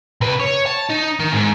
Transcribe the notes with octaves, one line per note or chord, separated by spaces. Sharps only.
C3 B4
C#5
A5
D#4
D#3
G#2